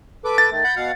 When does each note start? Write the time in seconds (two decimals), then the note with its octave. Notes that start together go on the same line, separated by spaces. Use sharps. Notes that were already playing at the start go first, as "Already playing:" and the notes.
0.25 A4 B4 D6
0.38 A6
0.51 D#3 A3
0.64 F#5 B5 G6
0.76 B2 F5 F#5